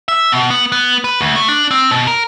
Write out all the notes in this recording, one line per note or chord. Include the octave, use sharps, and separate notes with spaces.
E5
B2
B3
B3
B4
D2
A3
D4
C4
B2
A#4